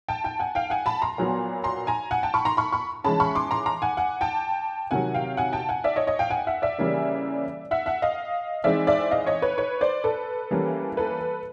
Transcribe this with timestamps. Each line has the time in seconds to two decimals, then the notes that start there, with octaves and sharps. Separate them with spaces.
0.08 G5 A5
0.24 G5 A5
0.39 F#5 G#5
0.55 F5 G5
0.70 F#5 G#5
0.86 A5 B5
1.02 A#5 C6
1.18 A#2 F#3 B3
1.64 A#5 C6
1.87 G#5 A#5
2.11 F#5 G#5
2.23 G5 A5
2.34 B5 C#6
2.45 A#5 C6
2.57 B5 C#6
2.72 B5 C#6
3.04 E3 G#3 C#4 A5 B5
3.20 B5 C#6
3.35 C6 D6
3.51 A#5 C6
3.66 A#5 C6
3.82 F#5 G#5
3.97 F#5 G#5
4.21 G5 A5
4.91 C3 D#3 F#3 F#5 G#5
5.14 F5 G5
5.37 F#5 G#5
5.53 G5 A5
5.69 F#5 G#5
5.84 D5 E5
5.96 C#5 D#5
6.07 C#5 D#5
6.19 F5 G5
6.30 F#5 G#5
6.47 E5 F#5
6.62 D5 E5
6.78 C#3 E3 G3 A#3 C#4
7.71 E5 F#5
7.86 E5 F#5
8.02 D#5 F5
8.64 E3 G#3 C4 D#4 D5 E5
8.87 D5 E5
9.11 D#5 F5
9.26 C#5 D#5
9.42 B4 C#5
9.58 B4 C#5
9.81 C5 D5
10.04 A4 B4
10.51 E3 G3 A#3 C#4
10.97 A4 B4